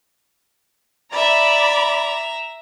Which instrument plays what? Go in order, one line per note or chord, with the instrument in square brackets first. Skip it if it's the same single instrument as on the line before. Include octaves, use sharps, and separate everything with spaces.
[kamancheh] D5 B5 [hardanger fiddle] E5 A#5